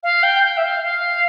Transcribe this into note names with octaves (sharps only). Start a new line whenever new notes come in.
F5
G5
G5
E5
F5
F5